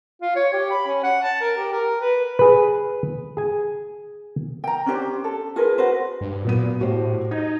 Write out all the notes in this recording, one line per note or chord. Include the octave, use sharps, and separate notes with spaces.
F4
C#5
G4
B5
C#4
F#5
A5
A#4
G4
A#4
B4
G#4 B4
G#4 G#5
G5 A#5
C#4 D4 G4 C5
A4
F4 G#4 A#4 B4
F#4 B4 C5
G2
A#2 F#3 B3 D#7
A2 F#4 G4 C5
D#4 G#6